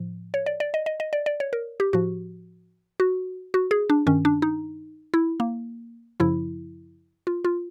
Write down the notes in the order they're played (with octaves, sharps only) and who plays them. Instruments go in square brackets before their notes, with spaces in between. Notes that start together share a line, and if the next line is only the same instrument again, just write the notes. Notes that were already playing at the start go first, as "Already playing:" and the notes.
Already playing: [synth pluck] A2 F3
C#5
D5
D5
D#5
D#5
D#5
D5
D5
C#5
A#4
G4
A2 F3 F#4
F#4
F#4
G#4
D4
G2 D#3 C#4
D4
D#4
E4
A#3
F#2 C#3 F3 E4
F4
F4